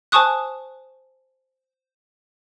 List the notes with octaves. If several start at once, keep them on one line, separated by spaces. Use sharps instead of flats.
C5 G#5 A5 C#6 D#6 F#6